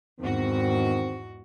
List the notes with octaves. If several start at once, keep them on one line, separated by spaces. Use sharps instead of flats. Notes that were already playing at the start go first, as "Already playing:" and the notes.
E2 G#2 D#3 C4 F#4